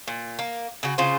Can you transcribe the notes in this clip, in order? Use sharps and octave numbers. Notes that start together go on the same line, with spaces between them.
A#2
A#3
C#3 F#4
C#3 F4 G#4 C5